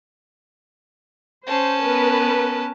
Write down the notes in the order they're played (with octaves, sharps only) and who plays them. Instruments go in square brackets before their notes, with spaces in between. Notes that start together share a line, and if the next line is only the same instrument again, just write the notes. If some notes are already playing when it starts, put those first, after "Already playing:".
[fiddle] C#4 A5 [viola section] C5
[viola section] B3 A#4 B4